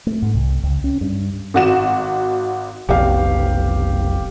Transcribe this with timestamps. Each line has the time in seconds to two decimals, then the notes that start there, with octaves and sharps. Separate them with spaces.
0.07 A3
0.22 G#2
0.34 C2
0.63 C#2
0.84 C#4
1.01 G2
1.54 G#1 F#4 E7
2.89 F1 B1 G4 F5